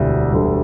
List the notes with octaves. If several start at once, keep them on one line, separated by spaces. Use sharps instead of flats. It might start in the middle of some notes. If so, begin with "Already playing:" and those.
Already playing: E1 D2 D3 G3
E1 D2 D3 G3